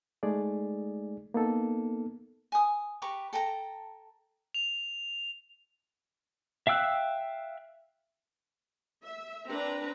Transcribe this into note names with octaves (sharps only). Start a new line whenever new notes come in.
G#3 A3 D#4 G#4 D5
A#3 B3 D#4 A4
G#5 D#6
G4 B4 A#5 C#6
A4 G5 A5 A#5
F7
E5 F5 G5 E6 F#6
E5
C4 D4 B4 A#5